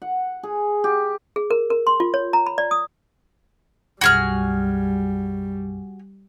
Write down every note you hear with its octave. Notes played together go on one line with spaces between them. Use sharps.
F#5
G#4
G4
G#4
A#4
A#4
C6
F4
C#5
A#5
B5
D5
D#6
B1 F#2 G3 F#4 G#4 F6